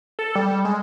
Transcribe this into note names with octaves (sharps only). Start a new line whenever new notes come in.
A4
G3
G#3